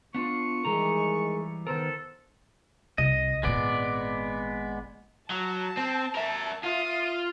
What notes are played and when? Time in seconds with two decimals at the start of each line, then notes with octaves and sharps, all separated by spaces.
0.15 B3 D4 F4 C#6
0.65 D#3 E3 G3 G#3 G#4 A#5
1.67 D#3 B3 A4 A#4 C5
2.98 C2 D#5
3.43 G#1 A#2 G#3 B3 D5
5.30 F#3 A5
5.77 C4
6.15 A#4 E5
6.64 F4 E5 D#6